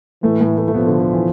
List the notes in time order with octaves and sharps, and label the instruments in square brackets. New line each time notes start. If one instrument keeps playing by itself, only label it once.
[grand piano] A2 A3 [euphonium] E3
[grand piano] A2 A3
A2 A3
A3
[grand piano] B2 B3 [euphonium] F3
[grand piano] D3
D3
E3